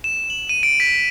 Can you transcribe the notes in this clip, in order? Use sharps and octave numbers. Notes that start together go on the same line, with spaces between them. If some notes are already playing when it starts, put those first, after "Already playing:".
E7
F#7
D#7
D7
B6